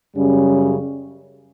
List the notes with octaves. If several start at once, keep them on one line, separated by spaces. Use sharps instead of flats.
F#2 C#3 G3 C#4